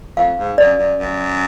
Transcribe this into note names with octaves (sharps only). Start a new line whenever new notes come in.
F2 F5
G#2
F#2 D5
F#2
F#2